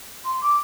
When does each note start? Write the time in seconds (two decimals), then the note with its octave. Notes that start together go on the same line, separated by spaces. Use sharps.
0.24 C6
0.41 D6